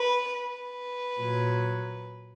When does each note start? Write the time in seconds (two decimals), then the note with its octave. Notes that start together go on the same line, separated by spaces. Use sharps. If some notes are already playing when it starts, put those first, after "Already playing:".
Already playing: B4
0.32 B4
1.19 A#2 F#3